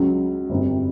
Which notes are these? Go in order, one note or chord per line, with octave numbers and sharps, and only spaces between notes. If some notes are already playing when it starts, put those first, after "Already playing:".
Already playing: C#2 C#3 F#3
G1 F2 C3